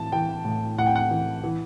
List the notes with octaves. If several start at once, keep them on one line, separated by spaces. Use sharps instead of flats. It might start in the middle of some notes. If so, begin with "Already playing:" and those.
Already playing: A2 E3 A5
E3 G5
A2
A2 F#5
G5
F#5
E3
E3